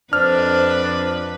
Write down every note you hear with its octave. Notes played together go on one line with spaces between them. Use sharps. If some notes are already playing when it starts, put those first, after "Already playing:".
F2 D4 B4 C5 F6